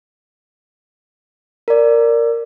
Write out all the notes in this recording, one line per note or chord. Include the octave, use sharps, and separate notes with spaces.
A#4 D5